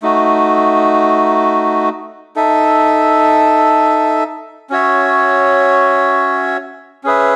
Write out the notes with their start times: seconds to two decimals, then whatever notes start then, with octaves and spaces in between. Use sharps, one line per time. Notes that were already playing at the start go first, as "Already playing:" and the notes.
0.02 A3 D#4 F#4
2.36 D#4 A4 E5
4.70 C#4 F#4 C#5 E5
7.04 C#4 G#4 B4 E5